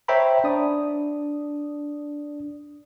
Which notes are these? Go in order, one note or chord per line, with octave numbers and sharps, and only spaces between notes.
C5 C#5 E5 G5 A#5 B5
D4 D5 D#6